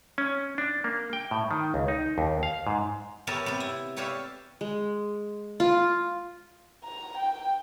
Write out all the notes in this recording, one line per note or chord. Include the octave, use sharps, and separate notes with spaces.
C#4
D4
A#3
G5
A2
D#3
C#2
D#4
D#2
F5
G#2
B3 G4 A#4 C#5 E5 A5
C3 B3
E4
G4 B4 C#5 D5 E5 F5
G#3
F4
A#5
G5